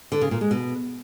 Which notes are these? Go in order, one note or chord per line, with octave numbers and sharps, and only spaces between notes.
D3
C#3
A#2
G#3
B2